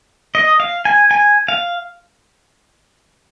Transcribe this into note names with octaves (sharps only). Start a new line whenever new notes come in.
D#5
F5
G#5
G#5
F5